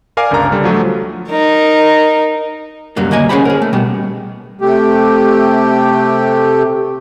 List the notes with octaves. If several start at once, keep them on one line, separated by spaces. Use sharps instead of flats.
A#4 D5 F5 G#5 D6
G1 C#2 D4 A#4 A#5 F6
D3 G3
F3 F#3 A3
D#4 A#4
C#2 F#2 F#3 G3 A#3
D2 A#3 D#5 G#5
C#4 G#4 C5 F#5 B5
G#4 A#4
A3
B2 G3 B3
C3 A3 G4